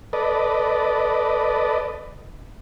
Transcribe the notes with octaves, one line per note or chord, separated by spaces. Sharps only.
A4 B4 D5 D#5